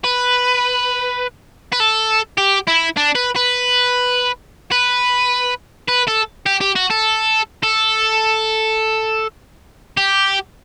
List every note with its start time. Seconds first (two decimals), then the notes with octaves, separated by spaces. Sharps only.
0.04 B4
1.73 B4
1.80 A4
2.38 G4
2.67 E4
2.97 D4
3.15 B4
3.36 B4
4.72 B4
5.88 B4
6.07 A4
6.46 G4
6.61 G4
6.76 F#4
6.91 A4
7.63 A4
9.97 G4